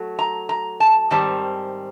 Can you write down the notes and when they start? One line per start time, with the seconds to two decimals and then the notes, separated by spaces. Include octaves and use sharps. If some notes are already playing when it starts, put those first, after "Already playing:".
Already playing: F#3 A3
0.19 A#5
0.49 A#5
0.80 A5
1.10 G#2 D#3 G3 C4 A5